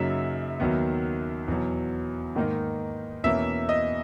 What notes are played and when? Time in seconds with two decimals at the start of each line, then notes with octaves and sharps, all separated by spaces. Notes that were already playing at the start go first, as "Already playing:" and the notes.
Already playing: F#2 C#3 F#3 A#3 D#4 E5
0.60 D#2 D#3 F#3 B3
1.48 E2 B2 F#3
2.35 G#2 D#3 A#3 D#4
3.24 E2 B2 A#3 C#4 E5
3.69 D#5